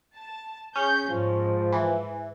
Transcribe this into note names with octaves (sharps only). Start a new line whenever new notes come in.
A5
C#4 G#4 G6
G#2 F3
E3